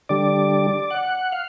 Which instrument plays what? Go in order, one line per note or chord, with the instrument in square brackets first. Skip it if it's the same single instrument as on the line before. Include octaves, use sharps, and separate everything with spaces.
[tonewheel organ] D3 G3 D5
F#5
F5